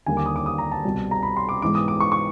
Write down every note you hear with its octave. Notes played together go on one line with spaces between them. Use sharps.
D#2 D3 G3 A#3 G#5
D6
D#6
D6
D#6
A#5
A5
C2 B2 G3
A#5
B5
C6
D6
G#2 E3 G#3 B3 D6
D#6
D6
C#6
C#6